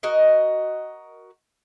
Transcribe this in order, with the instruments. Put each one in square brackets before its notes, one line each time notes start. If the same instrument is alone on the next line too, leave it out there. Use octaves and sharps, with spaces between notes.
[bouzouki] F#4 A#4 D#5